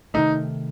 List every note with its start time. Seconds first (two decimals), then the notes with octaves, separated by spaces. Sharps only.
0.14 C3 D#3 A3 D#4